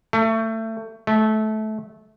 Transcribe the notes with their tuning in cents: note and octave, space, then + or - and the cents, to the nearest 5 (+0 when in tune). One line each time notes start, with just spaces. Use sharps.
A3 +25
A3 -20